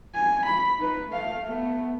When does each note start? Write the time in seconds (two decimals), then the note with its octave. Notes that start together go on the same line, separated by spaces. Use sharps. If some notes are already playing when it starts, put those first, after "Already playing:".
0.15 G#5
0.46 B5
0.78 D#4 B4
1.09 A3 F5
1.45 A3 B3